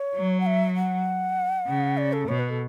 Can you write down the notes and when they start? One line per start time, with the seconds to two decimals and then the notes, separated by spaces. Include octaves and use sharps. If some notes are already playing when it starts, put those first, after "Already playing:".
Already playing: C#5
0.15 F#3
0.40 F#5
0.46 E5
0.76 F#5
1.67 C#3
1.97 D5
2.13 A4
2.28 B2 C#5
2.39 B4
2.50 A4